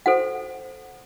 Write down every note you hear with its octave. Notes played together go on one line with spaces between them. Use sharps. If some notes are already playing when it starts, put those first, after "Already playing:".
F#4 A4 C5 F#5